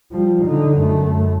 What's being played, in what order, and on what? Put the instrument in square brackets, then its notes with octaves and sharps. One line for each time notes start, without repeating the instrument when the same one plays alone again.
[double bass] F3 G3
D3 D#4
F#2 A3